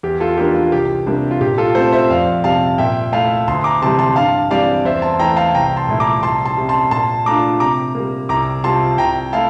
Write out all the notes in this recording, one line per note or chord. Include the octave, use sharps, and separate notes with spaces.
E2 G4
F4 A4
E3 A#3 D4 F4 G4
F4
C2 G4
C3 G3 A#3 D4
F4
A#2 G4
F4 A4
A3 C4 F4 A4 C5
C5 E5
F2 D5 F5
C3 G3 F5 A5
A#2 E5 G5
A3 E4 F5 A5
D2 A5 C6
A#5 D6
C3 E3 G3 A5 C6
A5 C6
G2 F5 A5
E3 G3 C4 D5 F5
E2 C5 E5
A5 C6
E3 A3 E4 G5 A#5
F5 A5
C2 G5 A#5
A5 C6
A#2 A3 E4
A#5 D6
C2 A5 C6
A5 C6
C3 G3
A5 C6
A#2 A5 C6
A3 D4 F4 A#5 D6
C3 A#5 D6
G3 A#3
C2 A#5 D6
C3 G3 C4 F4 A5 C6
C2 G5 A#5
A3 E4 F5 A5